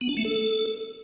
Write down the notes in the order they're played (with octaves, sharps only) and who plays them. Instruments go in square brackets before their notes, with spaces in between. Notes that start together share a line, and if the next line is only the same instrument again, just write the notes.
[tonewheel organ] B3
D4
A3
A4